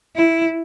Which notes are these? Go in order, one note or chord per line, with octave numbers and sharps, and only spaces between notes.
E4